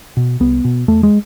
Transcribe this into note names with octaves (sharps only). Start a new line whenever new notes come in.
B2
C2 B3
B2
E2 A3
G#3